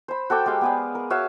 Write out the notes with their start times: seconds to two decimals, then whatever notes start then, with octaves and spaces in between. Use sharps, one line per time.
0.08 C5 B5
0.30 F#4 A4 G5 D6
0.46 G#3 G4 F5 G5
0.61 B3 G#4 D5
0.95 A#4
1.10 F#4 C#5 E5 F5